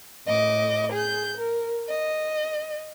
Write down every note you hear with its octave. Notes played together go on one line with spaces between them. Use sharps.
A2 D#5 D6
G#4 G6
A#4
D#5